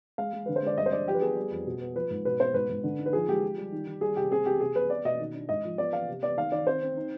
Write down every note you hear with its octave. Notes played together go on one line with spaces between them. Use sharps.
G#3 F5
G#3
D3 B4
C5
G#3 D5
G2 D#5
C5
D4 D5
F3 G4
B4
B3 G#4
G3
F2
B2
B3
F3 B4
G#2
B2 B4
B3 C5
G#2 B4
G#2
D3
D#4
B4
F3 G#4
G#3 G4
F4
G3
D#3
D#3
G3 G#4
C3 G4
C4 G#4
C4 G4
C3 G#4
C3 B4
B3 D5
B2 D#5
D#3
D4
G#2 D#5
F3
B3 D5
B3 F5
C3
B3 D5
D#3 F5
D#3 D5
C4 C5
C4
D#4